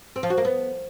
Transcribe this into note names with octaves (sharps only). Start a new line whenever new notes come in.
C4
F3
F#4
A#3
B3